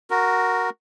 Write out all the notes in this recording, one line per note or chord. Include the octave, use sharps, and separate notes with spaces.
F#4 A#4